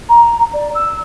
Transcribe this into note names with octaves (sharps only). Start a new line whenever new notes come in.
A#5
D5
E6